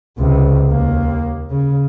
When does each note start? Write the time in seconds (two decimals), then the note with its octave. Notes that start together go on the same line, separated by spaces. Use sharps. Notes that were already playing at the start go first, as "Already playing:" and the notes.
0.18 C#2 C3
0.68 D#2 A#3
1.50 C#3